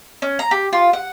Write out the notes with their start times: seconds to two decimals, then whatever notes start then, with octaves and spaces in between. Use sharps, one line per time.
0.22 C#4
0.39 A#5
0.51 G4
0.73 F4
0.93 F#5